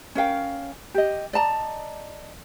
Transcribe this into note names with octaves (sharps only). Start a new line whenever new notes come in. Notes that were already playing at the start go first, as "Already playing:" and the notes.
C#4 A#4 F5 G5
G4 D#5
D5 D#5 A5 A#5